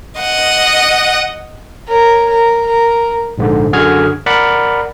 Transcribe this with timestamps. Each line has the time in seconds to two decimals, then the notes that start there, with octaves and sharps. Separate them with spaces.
0.19 D#5 F#5
1.88 A#4 C#5
2.29 A#4
2.66 A#4
3.38 A#1 G#2 D3
3.73 F#2 D3 F#4 G#4 F6 G#6
4.26 A#4 D5 F#5 B5